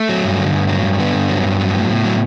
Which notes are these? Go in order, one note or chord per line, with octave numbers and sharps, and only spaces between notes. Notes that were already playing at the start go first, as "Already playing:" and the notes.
Already playing: A3
F#3
G2
D3
G2
F#3
G2
D3 B3
G2
F#3
G2
F#3
A2
A2
F#3